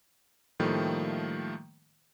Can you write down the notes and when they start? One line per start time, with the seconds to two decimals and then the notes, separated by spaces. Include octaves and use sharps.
0.60 A2 D#3 F3 G3 A3 A#3